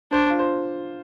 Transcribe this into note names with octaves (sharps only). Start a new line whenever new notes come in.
D4 C5
F4
C5